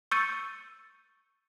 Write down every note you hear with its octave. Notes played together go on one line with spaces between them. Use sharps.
C#6 E6 G6 A6 C#7 D#7